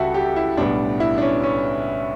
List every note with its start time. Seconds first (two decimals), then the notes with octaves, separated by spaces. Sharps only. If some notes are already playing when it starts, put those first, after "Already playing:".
Already playing: C#2 C#3 G3 F#4 G4 A4 E5
0.14 G4
0.36 E4
0.57 B1 A2 G3 B3 D4
1.00 E4
1.18 D4
1.22 C#4
1.43 C#4